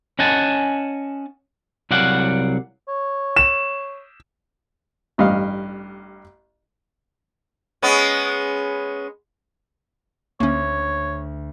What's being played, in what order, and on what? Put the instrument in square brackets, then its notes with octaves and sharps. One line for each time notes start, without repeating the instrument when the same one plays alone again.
[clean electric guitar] C#4 D#5 F#5 G#5 A5
C2 F#3 D5 F5 F#5
[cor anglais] C#5
[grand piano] E7
[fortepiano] A1 G2 D#5 F5
[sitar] G#3 B3 C#4
[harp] D2 [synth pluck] A#3 C#4 [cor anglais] C#5